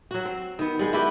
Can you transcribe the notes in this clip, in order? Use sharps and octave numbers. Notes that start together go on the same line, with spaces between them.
F#3 F#4
C4
D#3 B3
G3 G#3
E4 F#4 G4 B4